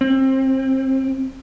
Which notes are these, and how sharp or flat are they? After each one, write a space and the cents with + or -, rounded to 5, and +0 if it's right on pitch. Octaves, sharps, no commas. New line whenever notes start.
C4 +25